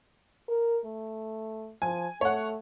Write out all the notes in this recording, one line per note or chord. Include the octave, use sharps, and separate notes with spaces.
A#4
A3
F3 G#5
A3 C#5 F#5